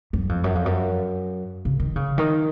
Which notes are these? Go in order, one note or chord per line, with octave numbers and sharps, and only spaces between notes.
F#2
F2
F#2
F2
F#2
C#3
D#3
C#3
D#3